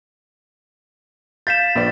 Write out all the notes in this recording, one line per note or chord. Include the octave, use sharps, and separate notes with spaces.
F5 G6 A6 B6 E7
A#1 B4 D5